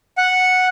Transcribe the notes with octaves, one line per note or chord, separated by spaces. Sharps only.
F#5